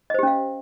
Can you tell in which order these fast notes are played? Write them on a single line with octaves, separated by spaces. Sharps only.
D#5 C5 G4 C#4 F5